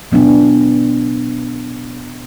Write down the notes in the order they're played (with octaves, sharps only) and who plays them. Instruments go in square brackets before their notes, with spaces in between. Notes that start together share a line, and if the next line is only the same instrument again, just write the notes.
[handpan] B2 F#3 B3 D4